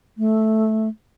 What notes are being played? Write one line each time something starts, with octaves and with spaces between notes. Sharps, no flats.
A3